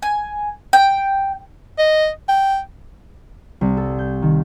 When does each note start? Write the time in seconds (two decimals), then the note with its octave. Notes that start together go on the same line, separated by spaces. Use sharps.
0.02 G#5
0.73 G5
1.79 D#5
2.29 G5
3.61 C2
3.77 A4
3.99 G6
4.22 D#3